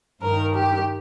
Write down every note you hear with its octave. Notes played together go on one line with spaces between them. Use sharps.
G2 D#3 A#4
G4